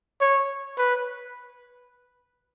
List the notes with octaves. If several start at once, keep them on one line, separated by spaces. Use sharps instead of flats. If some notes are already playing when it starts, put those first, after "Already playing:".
C#5
B4